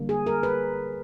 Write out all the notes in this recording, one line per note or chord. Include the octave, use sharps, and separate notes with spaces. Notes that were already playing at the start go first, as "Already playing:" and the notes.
Already playing: D3 G3 A#3
G#4
A#4
B4